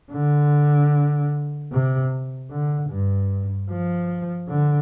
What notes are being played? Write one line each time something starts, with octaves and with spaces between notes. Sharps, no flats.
D3
C3
D3
G2
F3
D3